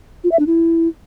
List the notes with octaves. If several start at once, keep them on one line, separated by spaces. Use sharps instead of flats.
F4
E5
D4
E4